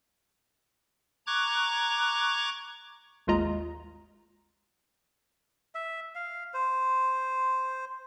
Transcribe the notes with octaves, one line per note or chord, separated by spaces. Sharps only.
A#5 C#6 D6 F#6 G#6
G#1 D#2 G#3 F4 D#5 A#5
E5
F5
C5